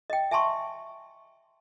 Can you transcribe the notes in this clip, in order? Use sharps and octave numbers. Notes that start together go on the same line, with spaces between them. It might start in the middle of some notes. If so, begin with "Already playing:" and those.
D#5 G5
E5 G#5 A5 C6 C#6